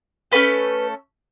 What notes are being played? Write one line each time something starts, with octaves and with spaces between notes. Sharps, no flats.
A3 C#4 F#4 A4 B4